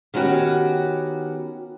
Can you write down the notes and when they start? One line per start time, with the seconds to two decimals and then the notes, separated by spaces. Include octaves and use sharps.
0.14 D#3 B3 C#4 F#4 G4